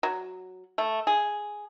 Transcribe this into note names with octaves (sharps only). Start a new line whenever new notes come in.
F#3
A3
G#4